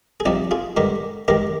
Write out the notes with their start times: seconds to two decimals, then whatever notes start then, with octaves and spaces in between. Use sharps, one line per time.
0.20 G#4
0.25 C2 C3 F3 D#4 G4
0.51 F4 G#4
0.77 G2 D3 G#3 G4 A#4
1.28 D#2 D#3 G#3 G4 A#4